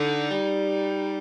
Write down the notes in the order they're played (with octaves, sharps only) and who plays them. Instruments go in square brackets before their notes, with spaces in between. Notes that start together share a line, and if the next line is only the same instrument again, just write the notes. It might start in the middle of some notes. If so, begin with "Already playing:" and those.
Already playing: [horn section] D3 [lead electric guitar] D#4
[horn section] G3